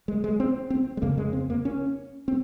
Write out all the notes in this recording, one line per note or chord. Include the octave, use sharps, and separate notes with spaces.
G#3
G#3
C4
C4
G#3
F2 C#3 A#3
G#3
C4
A#3
C#4
C4